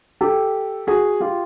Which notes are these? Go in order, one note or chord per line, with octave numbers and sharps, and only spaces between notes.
G4 A4
F#4 G#4
F4 G4